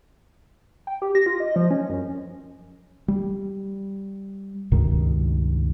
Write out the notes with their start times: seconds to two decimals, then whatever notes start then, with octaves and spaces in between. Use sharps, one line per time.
0.87 G5
1.02 G4
1.15 A#6
1.26 F4
1.40 D#5
1.56 F3
1.71 C#4
1.90 F#2
3.08 G3
4.72 C#2 G2 B2 D#3